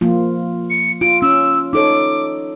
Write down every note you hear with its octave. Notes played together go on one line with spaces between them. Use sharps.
F3 A#3 F4
C#7
F4 D7
C#4 E6
D#4 A4 C#5 D6